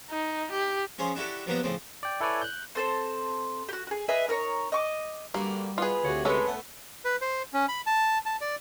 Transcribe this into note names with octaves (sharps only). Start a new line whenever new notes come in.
D#4
G4
F3 C#4 G#4 C6
D4 E4 F#4 G4 A4
F3 F#3 A#3 B3 D4 G4
A2 C#3 F3 C4
D5 G5
E4 A4 B4 C#5 D5 G#5
F#6 G6
C4 A4 C5
F#4 G4
F#4 G#4
G#4 B4 D#5 E5
D#4 A#4 B4 C#5
D#5 C#6 D6
G2 D3 G3 A#3 F#4
B2 B3 F4 G#4 B4
D2 C3 F#4 C#5
G#3 C#4 A4 B4 C#5
A3 B3
B4
C5
C#4
B5
A5
A5
D5